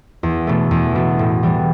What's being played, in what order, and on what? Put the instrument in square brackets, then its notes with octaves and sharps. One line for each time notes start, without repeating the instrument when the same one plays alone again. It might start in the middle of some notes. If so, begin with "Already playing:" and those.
[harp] E2
B2 A3
E2
B2 A3
A2
E3 G3